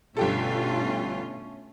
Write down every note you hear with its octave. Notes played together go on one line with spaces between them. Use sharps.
G1 B2 A3 C#4 F4 G4 A4